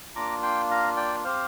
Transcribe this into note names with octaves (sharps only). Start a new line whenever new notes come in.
A#3 D4 F4 A#5 D6
G5 C6
F5 A#5
D5 G5
C4 G4 C5 F5